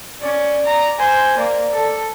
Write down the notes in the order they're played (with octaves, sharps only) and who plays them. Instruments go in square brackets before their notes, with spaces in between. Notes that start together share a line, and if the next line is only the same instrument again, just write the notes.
[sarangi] C#4 [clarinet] D5
[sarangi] A#5
[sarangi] C5 [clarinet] G#5
[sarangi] A#3 [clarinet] D5
[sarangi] A4